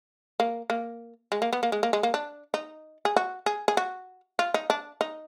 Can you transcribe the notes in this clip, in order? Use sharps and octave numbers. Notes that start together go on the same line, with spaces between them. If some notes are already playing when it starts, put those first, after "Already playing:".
A#3
A#3
G#3
A#3
B3
A#3
G#3
A#3
G#3
A#3
D4
D#4
G#4
F#4
G#4
G#4
F#4
F4
D#4
D4
D#4